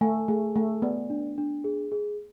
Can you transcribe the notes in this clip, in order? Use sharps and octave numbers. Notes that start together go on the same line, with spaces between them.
A3 G#5
A3 G#4
A3 G#5
B3 D5
D4
D4
G#4
G#4